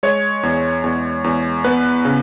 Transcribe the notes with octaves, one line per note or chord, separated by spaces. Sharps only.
G#3 C#5
E2
E2
E2
B3 B4
C#3